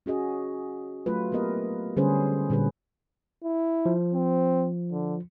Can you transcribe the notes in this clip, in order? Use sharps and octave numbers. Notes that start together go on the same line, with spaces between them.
C#4 F#4 G#4 D#5
F#3 A3 F4 B4
A#3 B3 G4 A#4 D#5
D3 G3 C#4 G#4 B4 C5
A#2 D3 G3 G#4 B4
E4
F3
C4
D3